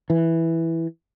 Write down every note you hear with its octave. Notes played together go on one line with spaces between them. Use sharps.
E3